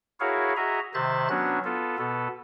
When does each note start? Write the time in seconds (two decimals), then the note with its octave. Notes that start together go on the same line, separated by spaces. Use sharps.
0.20 E4 F#4 G#4 A#4 C#5 F5
0.56 F#4 G#4 D#5 E5 A#5
0.94 C3 D#3 C5 E5 F#6 A6
1.29 F#3 B3 C#4 D4 F#4
1.64 B3 F4 A4
1.98 B2 B3 A4